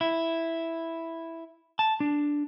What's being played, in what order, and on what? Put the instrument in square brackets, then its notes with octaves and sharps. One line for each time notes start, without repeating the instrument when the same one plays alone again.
[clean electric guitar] E4
A5
D4